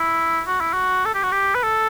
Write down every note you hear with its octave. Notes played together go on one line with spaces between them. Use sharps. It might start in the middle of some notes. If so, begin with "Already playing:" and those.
Already playing: E4
F#4
E4
F#4
A4
G4
F#4
G4
B4
A4